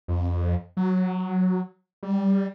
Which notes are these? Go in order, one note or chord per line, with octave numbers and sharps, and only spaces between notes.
F2
F#3
G3